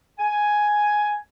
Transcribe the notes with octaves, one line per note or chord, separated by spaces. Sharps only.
G#5